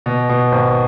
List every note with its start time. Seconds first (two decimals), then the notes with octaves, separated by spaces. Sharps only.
0.06 B2
0.29 B2
0.52 G#1